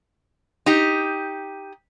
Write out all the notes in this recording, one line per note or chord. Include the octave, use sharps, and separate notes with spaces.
D#4 G4